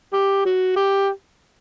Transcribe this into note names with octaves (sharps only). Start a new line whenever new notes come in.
G4
F#4
G4